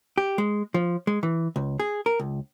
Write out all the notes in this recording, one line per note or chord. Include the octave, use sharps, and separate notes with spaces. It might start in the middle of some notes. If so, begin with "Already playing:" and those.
G4
G#3
F3
G#3
E3
C#2
G#4
A#4
C#2